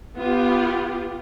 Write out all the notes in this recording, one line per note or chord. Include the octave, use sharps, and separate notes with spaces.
B3 F4 G4